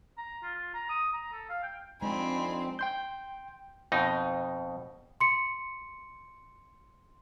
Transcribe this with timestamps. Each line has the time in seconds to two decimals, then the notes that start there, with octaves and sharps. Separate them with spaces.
0.18 A#5
0.43 F4
0.55 F4
0.74 A#5
0.89 D#6
1.13 A#5
1.33 A4
1.50 F5
1.63 G5
2.02 F2 G#3 C4 D4 D#4 G#5 B5
2.79 G5 C6 G6
3.92 F2 B2 D#4
5.21 C6 C#7